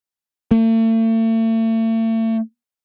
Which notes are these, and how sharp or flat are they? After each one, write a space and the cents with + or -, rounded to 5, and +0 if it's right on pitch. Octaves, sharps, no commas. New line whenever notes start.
A3 +40